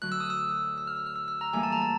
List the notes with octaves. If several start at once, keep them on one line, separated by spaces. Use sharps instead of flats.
D2 D3 F#3 F#6
E6
D#6
E6
E6
F6
E6
F6
E6
E6
A#5
A2 E3 G3 A#3 G#5
A5
A#5
A5